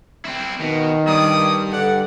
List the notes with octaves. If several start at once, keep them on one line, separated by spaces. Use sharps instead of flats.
C4 E4
B2 D#3
G2 D5 A#5 D#6
D3 D5 F#5